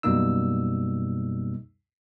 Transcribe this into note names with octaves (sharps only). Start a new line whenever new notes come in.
F#2 B2 G3 A#3 D#4 E6